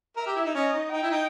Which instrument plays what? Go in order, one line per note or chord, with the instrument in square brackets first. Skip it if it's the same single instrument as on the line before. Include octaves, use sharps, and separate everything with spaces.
[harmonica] A#4 [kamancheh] E5
[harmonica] G4
E4
D#4
[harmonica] C#4 [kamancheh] D#5
[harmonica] D#4
[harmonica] D#4 [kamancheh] G5
[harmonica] E4
D#4